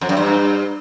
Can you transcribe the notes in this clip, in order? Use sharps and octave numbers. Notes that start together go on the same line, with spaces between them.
F2
F#2
G2